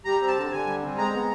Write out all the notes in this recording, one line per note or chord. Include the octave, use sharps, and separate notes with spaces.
G3 A#5
C4
A5
D3
D3 G#5
G3
C4
G#3 A#5
B3